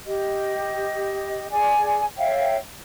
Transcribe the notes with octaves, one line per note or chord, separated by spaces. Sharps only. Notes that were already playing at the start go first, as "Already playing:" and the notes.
G4 D#5
G#4 D5 G#5
C#5 E5 F5 G5